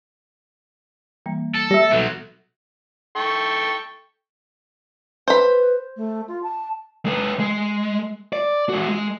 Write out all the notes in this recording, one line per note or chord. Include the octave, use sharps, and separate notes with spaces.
E3 G3 A#3
A4
G3 E5 A#6
B2 F#3 A4
A4 G5 C#6
B4 C5 B5
A3
F4
A5
G#3 B4
G#3
D5
G#3 F#4
G#3